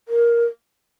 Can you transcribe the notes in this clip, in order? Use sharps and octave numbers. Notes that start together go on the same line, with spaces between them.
A#4